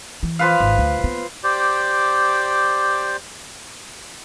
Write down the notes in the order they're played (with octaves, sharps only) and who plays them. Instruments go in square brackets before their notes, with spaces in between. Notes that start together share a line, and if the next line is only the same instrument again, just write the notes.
[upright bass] E3
[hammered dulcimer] F3 B4 F5
[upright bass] G#1
D2
A#3 B3
[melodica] G4 C5 D5